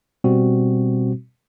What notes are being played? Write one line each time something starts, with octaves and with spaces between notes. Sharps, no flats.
B2 G3 C4 F#4